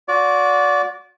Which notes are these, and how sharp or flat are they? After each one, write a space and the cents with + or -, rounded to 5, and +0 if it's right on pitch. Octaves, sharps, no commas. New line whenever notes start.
F#4 -30 D5 -25